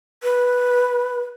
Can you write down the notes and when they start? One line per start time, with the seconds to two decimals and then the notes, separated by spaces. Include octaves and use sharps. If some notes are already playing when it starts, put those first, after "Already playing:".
0.23 B4